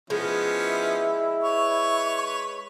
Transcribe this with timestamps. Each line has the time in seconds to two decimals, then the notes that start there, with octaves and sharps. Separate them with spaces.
0.10 F3 G#3 B3 C#4 E4
1.43 B4 C#5 C#6